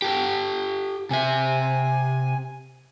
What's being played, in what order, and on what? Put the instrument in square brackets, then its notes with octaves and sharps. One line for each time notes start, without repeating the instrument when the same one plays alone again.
[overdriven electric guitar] G4 A4
[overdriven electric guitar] C3 E5 [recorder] G#5